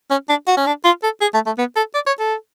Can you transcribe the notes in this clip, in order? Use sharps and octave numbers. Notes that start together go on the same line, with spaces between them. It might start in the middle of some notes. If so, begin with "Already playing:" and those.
C#4
D4
F#4
C#4
D4
F4
A4
G#4
A3
A3
B3
A4
D5
C#5
A4